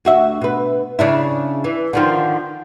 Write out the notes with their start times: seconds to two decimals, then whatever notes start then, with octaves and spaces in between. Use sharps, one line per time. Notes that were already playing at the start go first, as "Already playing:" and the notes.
0.05 D2 F#4 E5
0.41 B2 B4
0.99 C#3 D4 E4
1.64 E3
1.93 D3 D#3 F3